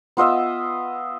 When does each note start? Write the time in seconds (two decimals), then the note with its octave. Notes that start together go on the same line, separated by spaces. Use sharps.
0.17 B3 F4 D#5 E5